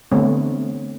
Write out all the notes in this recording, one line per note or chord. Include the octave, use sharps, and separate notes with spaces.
D3 E3 A3 B3 C4 C#5